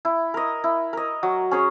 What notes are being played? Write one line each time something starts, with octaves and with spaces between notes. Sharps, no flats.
E4
A#4 D#5
E4
A#4 D#5
F#3
C#4 G#4 C#5